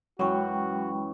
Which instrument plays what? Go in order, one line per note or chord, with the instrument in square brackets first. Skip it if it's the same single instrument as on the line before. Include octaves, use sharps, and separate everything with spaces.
[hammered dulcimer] F#2 E3 C#6 [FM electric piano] F#3 [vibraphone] G#3 G5 B5 [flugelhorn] F#4